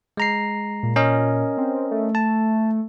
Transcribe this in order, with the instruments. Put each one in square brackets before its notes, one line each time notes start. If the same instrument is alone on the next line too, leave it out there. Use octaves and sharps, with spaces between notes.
[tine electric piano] G#3 A#5 C7
[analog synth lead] A#2
[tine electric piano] C#4 A#4 D#5
[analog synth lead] C4
A3
[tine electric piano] A5